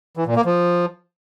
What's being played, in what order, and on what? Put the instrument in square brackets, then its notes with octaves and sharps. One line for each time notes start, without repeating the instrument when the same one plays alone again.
[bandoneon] E3
A#2
A#3
F3